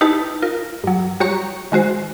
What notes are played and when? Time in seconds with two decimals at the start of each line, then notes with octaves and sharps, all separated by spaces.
0.01 D#4 E4 G4 B4 A5
0.42 F4 A#4
0.84 G2 F#3
1.20 G3 F#4 G4 C#5 A#5 C#6
1.72 D#3 G#3 F#4 C5